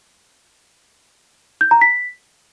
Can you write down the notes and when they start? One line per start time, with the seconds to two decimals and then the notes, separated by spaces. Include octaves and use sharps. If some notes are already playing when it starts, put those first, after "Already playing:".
1.61 G6
1.71 A#5
1.81 B6